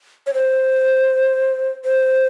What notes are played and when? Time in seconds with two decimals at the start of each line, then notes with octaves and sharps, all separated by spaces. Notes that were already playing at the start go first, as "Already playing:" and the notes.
0.27 C#5
0.34 C5
1.84 C5